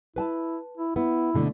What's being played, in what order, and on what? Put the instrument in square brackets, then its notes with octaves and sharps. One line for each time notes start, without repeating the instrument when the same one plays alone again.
[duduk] E4 [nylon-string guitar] B4 G#5 A5
[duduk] E4
[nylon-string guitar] B3 [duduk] E4
[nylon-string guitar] B2 D3 A3